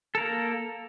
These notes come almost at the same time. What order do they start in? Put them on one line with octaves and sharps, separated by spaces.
A4 A#4 A#3